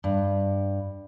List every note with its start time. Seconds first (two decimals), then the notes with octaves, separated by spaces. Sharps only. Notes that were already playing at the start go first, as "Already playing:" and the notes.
0.04 G2